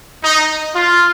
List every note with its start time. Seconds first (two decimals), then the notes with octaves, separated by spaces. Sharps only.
0.24 D#4
0.75 F4